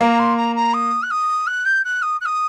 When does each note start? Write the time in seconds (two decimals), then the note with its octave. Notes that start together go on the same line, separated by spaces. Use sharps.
0.01 A#3 A#5
0.19 C6
0.37 A#5
0.56 A#5
0.74 D#6
1.03 F#6
1.11 D#6
1.47 F#6
1.65 G6
1.85 F#6
2.02 D#6
2.21 F#6
2.26 D#6